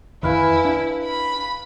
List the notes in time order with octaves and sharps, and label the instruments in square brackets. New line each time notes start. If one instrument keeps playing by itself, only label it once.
[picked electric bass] F2 D#3 [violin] E4 [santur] B4 F5 G#5
[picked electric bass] D4
[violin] B5